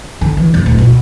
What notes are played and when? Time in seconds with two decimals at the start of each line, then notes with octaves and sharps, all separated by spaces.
0.21 D3
0.37 E3
0.54 E1
0.66 D1
0.78 B2